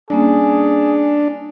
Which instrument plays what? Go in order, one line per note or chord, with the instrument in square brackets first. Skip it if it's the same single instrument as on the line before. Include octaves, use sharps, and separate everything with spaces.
[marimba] G3 A#3 C#4 [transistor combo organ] D4 [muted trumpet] G#4